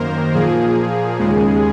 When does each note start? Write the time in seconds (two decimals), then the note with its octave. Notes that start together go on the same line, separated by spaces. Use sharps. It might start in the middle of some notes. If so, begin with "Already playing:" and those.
Already playing: F#2 D#3 A#3 A#4 C5
0.35 A#2 F3 A#3 G#4
1.19 D#2 C#3 G#3